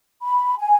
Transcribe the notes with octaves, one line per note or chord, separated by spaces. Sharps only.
B5
G#5